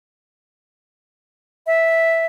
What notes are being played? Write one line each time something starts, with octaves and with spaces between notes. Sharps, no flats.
E5